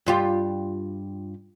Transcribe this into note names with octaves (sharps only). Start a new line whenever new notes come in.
G2 F4 G4